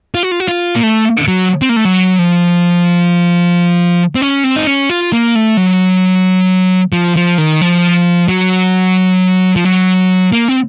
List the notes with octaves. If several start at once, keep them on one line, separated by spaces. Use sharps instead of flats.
F4
F#4
F4
F#4
F4
A#3
A3
F#3
C4
A#3
A3
F#3
F3
C4
C#4
C4
D#4
C#4
F4
A#3
A3
F#3
F3
F3
D#3
F3
F#3
F3
F#3
A#3
C4